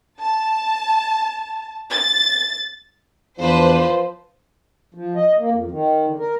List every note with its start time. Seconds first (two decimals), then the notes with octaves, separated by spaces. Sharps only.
0.21 A5
1.91 A6
3.39 E2 F3 D4 B4 C5
4.95 F3
5.16 D#5
5.39 A#3
5.51 F2
5.71 D#3
6.06 D3
6.19 A#4